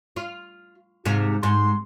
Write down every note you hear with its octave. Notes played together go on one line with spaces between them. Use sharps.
F4
G#2 C3 F4
G#2 C6